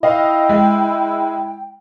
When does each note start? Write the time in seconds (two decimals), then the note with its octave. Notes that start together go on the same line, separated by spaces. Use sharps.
0.03 E4 D#5 F5 G5
0.49 G#3